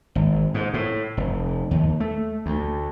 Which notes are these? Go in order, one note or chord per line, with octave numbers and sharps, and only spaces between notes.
G#1
G#2
A2
F1
D#2
A3
D2